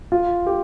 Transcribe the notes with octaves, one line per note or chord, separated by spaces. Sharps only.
F4
G4